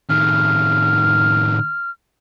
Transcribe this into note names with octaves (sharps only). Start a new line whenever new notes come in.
A2 D#3 F6